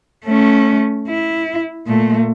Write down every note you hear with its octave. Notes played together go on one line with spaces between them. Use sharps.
A3 C#4
E4
A#2 A3